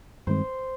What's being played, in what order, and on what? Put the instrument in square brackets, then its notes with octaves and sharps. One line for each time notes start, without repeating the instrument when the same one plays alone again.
[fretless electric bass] G2 D#3 G#3 C4 [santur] C5